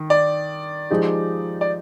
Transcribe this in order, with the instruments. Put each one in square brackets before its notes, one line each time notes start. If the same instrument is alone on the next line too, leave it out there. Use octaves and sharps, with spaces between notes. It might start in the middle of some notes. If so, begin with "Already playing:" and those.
Already playing: [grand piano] D#3
[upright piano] D5
[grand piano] F3 G#3 D#4 G4
[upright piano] D5